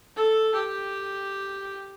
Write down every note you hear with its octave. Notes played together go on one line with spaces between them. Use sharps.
A4
G4